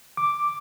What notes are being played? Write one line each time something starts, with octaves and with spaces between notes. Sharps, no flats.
D6